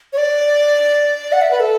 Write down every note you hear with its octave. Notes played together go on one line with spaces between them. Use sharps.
C#5
D5
F#5
E5
B4
A4